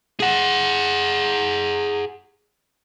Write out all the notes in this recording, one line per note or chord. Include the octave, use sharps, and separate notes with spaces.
G#4 F#5